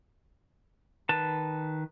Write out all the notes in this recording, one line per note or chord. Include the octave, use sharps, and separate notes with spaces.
D#3 B4 A5